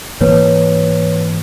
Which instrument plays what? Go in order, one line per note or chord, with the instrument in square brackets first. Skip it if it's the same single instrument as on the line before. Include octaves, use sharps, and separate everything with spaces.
[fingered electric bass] G#2 E3 A#3 [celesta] B4 C#5